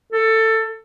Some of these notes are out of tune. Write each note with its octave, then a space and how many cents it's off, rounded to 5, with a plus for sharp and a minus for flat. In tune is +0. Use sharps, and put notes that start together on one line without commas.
A4 +15